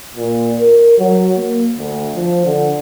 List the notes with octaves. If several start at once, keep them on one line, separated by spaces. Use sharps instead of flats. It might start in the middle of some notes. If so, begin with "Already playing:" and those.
A#2
A#4
F#3
A#3
D2
F3
D3